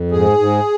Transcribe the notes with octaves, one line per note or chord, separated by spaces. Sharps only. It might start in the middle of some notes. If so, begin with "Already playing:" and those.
Already playing: F2
G#2 G#4
G#2